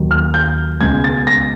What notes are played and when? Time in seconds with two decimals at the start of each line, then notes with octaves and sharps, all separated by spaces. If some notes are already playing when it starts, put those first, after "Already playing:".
Already playing: D#2 D#3 F#3
0.11 F6
0.34 G6
0.81 C#2 B2 G#3 G#6
1.04 A6
1.27 A#6